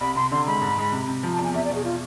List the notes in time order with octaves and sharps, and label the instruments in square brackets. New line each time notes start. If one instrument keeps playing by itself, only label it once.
[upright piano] C2 [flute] B5
[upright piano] C3 [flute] C6
[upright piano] D3 [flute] C6
[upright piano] G#3 [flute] B5
[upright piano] G#2
G#3
C3
C3
F3
[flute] A5
[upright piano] E2
[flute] G#5
[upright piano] E2 [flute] E5
[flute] D5
[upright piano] B2
[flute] G#4
F4